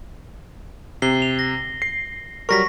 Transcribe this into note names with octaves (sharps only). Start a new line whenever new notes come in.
C3 C7 G7
F7
A#6
C7
F#3 G3 A#4 C#6 A#6 B6